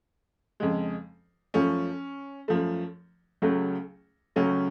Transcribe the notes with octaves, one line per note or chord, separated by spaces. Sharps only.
F2 C#3 G#3
F#2 F3 A3 C#4
F#2 F3 A3
C#2 C#3 F#3 A3
C#2 C#3 F#3 A3 C#4